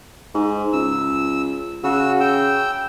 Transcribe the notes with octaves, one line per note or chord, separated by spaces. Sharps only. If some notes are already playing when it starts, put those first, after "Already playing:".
G#2
C#2 E6
C#3 F#4 E6
G5 E6